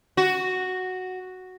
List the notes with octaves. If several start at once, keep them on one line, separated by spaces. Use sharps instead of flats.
F#4